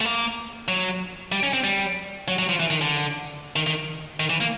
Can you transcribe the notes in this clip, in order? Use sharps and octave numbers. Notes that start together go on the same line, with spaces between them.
A3
A#3
F#3
G3
C#4
C4
G3
F#3
F#3
F3
E3
D#3
D3
D#3
D#3
D#3
E3
A#3